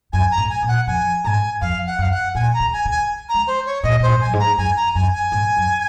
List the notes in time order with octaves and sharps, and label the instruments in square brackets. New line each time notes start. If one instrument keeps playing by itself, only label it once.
[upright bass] F#2 [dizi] G#5
[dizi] A#5
[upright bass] G#2
[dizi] G#5
[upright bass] A#2
[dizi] F#5
[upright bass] F2 [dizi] G#5
[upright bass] G#2 [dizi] G#5 A#5
[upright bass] F2 [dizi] F5
[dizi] F#5
[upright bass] F#2 [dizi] F5
[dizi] F#5
[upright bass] A#2 [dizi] G#5
[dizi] A#5
[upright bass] C#3
[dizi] G#5
[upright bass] C#3
[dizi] G#5
A#5
[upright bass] G#3
[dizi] C5
C#5
[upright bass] A#2 [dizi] D#5
[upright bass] A#2 [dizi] C5
[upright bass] G#2
[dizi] G#5
[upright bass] F#2
G#2
[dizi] A#5
[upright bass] F#2 [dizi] G#5
[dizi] A#5
[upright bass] F#2 [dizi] G#5
[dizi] G#5
[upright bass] G#2
F#2